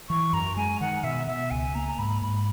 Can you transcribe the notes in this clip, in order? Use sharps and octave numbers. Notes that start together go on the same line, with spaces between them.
E3 C#6
F#2 A#5
G#3 G#5
D#3 F#5
B2 E5
B2 E5
C#2 G#5
A#3 A#5
A#5
G#2 B5
G#2 B5